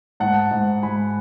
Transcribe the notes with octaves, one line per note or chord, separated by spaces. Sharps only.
G#2 F#5 A5
G#2
G#2 G#5 B5